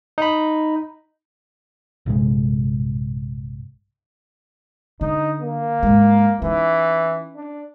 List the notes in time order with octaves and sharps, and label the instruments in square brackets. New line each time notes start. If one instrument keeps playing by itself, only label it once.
[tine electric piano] D#4 B5
[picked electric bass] A#1 G2 C3 G#3
[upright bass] D3 [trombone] D#4
[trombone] A#3
[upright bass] G#2 G#3
[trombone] E3 [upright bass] C#4 D#4
[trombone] D4